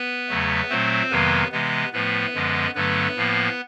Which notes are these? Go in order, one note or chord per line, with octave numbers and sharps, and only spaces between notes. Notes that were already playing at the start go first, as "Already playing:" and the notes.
Already playing: B3 B4
E2 C#3 F#3 A3
A#2 F#3 A3 C4 C5
F2 C3 D#3 F#3 A#3 B3 B4
C3 E3 G#3 B3 B4
A2 F3 A3 B3 B4
F#2 D3 F3 G#3
G2 D3 F#3 A3 B3 B4
A2 F3 A#3